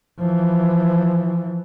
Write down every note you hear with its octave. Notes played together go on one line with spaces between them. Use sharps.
E3 F3